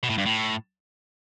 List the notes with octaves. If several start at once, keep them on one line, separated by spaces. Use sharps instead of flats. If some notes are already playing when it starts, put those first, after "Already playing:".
B2
A2
G2
A2